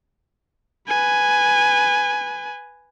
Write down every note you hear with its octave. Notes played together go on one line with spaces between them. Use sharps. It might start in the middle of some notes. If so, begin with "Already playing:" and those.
B4 G#5